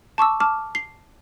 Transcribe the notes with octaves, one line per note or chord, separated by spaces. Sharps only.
A5 C#6 D6 E6
A5 D6 F6
C7